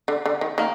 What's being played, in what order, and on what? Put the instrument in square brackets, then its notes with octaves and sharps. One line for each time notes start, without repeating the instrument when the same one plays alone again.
[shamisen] D3
D3
D#3
[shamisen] D#3 [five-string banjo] A#3